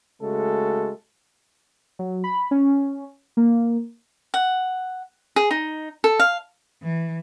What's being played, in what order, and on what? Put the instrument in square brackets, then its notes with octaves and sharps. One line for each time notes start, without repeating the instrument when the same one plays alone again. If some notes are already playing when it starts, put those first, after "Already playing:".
[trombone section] C#3 G#3 A3 F#4 A4
[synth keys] F#3
B5
C#4
A#3
[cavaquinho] F#5
G#4
D#4
A4
F5
[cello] E3